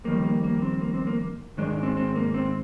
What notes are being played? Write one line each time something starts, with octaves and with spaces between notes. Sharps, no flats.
F2 D#3 G3 A#3
A#3
A#3
C4
A#3
C4
A#3
G#2 D#3 G#3 D4
D4
C4
C4
A#3
C4